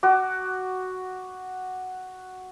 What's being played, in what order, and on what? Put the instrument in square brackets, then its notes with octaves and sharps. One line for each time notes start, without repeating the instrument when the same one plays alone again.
[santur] F#4 D6